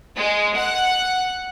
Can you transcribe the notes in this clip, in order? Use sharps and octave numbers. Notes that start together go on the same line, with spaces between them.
G#3
F#5